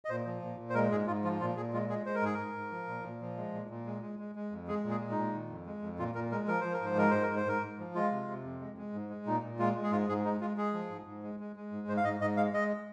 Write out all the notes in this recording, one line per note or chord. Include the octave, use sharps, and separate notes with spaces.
D#5
A#2 C5
F3
A#2
A#2
C5
G#3 A#4
G#2 G#4
G#2 F4
F3 F4
A#2 F4
A#2 G#4
G#3 F4
G#3 G#4
G#3 C5
A#4
G#2 G#4
G#2 A#4
G#2
F3
A#2
A#2
F3
G#3
A#2
A#2
G#3
G#3
G#3
G#3
F2
G#3 G#4
A#2
G#4
G#3
D#4
A#2
D#3
F2
G#3
F2
A#2 F4
A#2 A#4
G#3 A#4
F3 A#4
F3 C5
A#4
G#2 C5
G#3 A#4
G#2 C5
A#4
G#2
C5
G#2 A#4
G#2
F3
G#3 F4
C3
C3
F2
G#3
G#3
G#2
G#3
A#2 D#4
A#2
G#3 F4
G#3
G#4
G#2 F4
G#2 G#4
G#3 D#4
G#3 F4
G#3 G#4
F3
G#2
G#2
G#3
G#3
G#3
G#2
G#2 C5
F5
G#2 D#5
G#2 D#5
G#3 F5
G#3 D#5